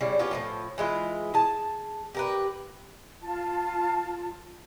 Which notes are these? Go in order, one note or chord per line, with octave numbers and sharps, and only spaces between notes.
C#3 G3 E4
B3 C#4 F4 G4
A2 D3 F3
E3 G#3 E4 F4
G#4 A5
G4 A#4 B4
F4 A5